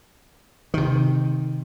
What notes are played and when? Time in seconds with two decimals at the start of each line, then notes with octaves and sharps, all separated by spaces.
0.74 C3 D#3